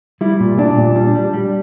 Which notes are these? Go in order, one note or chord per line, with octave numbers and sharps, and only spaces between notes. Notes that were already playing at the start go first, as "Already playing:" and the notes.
G3 E4
A#2
A#2 D4
A#2
G3 D4
G3
G3